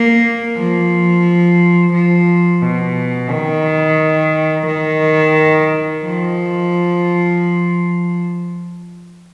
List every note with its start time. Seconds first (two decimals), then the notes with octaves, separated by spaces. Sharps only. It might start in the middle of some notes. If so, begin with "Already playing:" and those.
Already playing: A#3
0.57 F3
1.93 F3
2.62 B2
3.31 D#3
4.67 D#3
6.04 F3